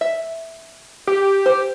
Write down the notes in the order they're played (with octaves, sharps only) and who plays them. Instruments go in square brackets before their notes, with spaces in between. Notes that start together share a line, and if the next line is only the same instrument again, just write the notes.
[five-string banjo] E5
[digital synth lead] G4
[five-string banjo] C5